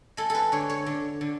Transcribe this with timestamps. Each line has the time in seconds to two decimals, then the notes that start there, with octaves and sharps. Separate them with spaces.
0.17 G#3 A4
0.30 A4 B4
0.52 D3 C#5
0.70 C#5
0.86 D3
1.21 D3